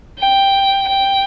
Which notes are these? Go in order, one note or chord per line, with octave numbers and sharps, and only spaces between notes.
G5
G5